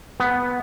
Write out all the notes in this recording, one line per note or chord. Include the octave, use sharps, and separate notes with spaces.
B3